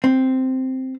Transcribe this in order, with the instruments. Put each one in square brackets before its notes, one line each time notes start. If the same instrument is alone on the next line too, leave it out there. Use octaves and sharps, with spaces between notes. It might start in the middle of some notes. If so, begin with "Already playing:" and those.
[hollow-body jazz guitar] C4